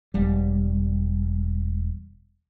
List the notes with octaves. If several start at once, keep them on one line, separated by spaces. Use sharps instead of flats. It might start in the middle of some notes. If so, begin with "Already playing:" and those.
E1 G3